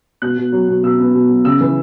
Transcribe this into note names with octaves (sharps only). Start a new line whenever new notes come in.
B2 F#6
B2
F#3
B2
B2 E6
B3
B2
F#3
C#3 E6
E3